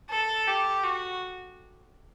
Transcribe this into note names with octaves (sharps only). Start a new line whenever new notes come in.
A4
G4
F#4